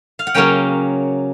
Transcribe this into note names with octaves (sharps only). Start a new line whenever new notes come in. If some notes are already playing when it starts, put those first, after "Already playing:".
F5
F#5
C#3 F#3 A#3 C#4 G5